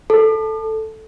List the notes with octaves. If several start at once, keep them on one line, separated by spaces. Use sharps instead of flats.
A4